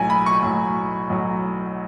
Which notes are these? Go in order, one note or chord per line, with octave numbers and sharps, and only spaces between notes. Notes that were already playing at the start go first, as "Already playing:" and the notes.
Already playing: B1 A2 F#3 G#5
B5
C#6
B1 A2 F#3
B1 A2 F#3